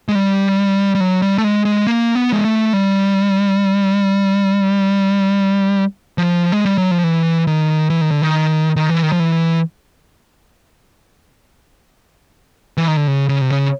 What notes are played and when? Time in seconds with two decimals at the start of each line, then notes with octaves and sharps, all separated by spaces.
0.09 G#3
0.15 G3
0.95 G3
1.00 F#3
1.22 G3
1.38 A3
1.44 G#3
1.65 G#3
1.87 A#3
2.15 B3
2.33 G#3
2.45 A3
2.73 G3
6.18 F3
6.52 G#3
6.65 G3
6.78 F#3
6.91 F3
7.04 E3
7.47 D#3
7.90 E3
8.01 D#3
8.11 D3
8.22 D#3
8.76 D#3
8.90 E3
9.03 D#3
9.12 F3
9.20 E3
12.77 E3
12.88 D#3
12.97 D3
13.07 C#3
13.29 C#3
13.41 C3
13.50 C#3